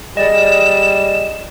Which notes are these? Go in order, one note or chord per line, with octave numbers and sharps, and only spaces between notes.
G3 G#4 D5 D#5 E7